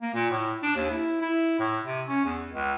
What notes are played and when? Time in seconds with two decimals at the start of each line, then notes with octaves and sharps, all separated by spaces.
0.02 A#3
0.14 A#2
0.30 A2
0.63 D4
0.76 D#2
0.91 E4
1.22 E4
1.59 A2
1.84 C3
2.08 C#4
2.25 E2
2.52 C#2